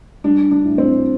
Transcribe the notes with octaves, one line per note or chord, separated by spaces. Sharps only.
G3 D4
D4
A2
C4